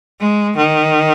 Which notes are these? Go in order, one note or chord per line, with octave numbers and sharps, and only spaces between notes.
G#3
D#3